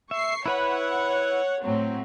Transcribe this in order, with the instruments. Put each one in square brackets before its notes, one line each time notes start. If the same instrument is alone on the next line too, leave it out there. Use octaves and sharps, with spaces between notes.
[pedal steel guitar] E5 [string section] C#6 C7
[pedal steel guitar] E4 B4 B5 [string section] C#5 F#5
[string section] A2 F#3 C4